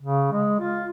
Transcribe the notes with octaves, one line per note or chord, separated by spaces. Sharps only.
C#3
G#3
F4